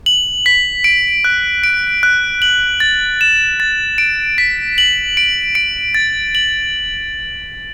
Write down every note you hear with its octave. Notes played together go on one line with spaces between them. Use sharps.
F#7
B6
D7
F#6
D7
F#6
F#7
A6
E7
A6
D7
B6
F#7
D7
D7
A6
F#7